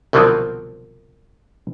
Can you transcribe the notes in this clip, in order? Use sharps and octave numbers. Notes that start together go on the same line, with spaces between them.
C2 B2 D3 F3 F#3 C4